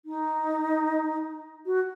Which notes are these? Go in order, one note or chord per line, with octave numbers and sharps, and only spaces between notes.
D#4
F#4